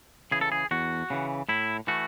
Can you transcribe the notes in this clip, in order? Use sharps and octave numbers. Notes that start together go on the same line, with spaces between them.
C#3 E3 G#4
A4
G#4
E2 F#4
C#3 E3
A2 E4
E3 A3 F#4